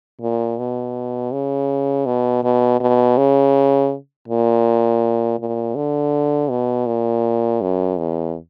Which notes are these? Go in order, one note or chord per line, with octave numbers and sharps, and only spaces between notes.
A#2
B2
C#3
B2
B2
B2
C#3
A#2
A#2
D3
B2
A#2
F#2
E2